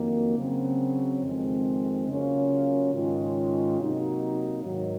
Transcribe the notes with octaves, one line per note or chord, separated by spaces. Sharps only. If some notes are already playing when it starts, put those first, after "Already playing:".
Already playing: F2 D#3 F#3 A#3
C#3 F#3 C4
F2 D#3 G#3 C4
C#3 F#3 A#3 C#4 F4
G#2 D#3 G#3 C#4 F4
C3 F#3 A#3 D#4
G#2 D#3 F#3